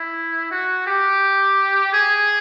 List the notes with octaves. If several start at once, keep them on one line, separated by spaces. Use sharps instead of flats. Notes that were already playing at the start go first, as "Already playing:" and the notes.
Already playing: E4
F#4
G4
G#4